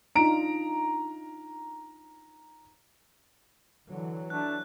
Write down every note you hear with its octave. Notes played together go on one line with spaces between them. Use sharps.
D4 D#4 F4 A#5 D7
D3 E3 F#3
A3 D4 F#6